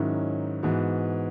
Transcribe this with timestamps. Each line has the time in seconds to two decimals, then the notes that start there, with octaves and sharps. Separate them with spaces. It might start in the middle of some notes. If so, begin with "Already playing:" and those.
Already playing: G#2 D#3 F#3 C#4 E4
0.63 G#2 E3 B3 F#4